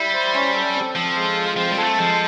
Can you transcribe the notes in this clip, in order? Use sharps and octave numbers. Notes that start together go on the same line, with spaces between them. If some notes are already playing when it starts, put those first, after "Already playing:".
Already playing: G3 E4
C5
C#4
A4
C4
F3 A4
G#3
F4
F3 C4
G3
G#3 A4
A3
F3 G#3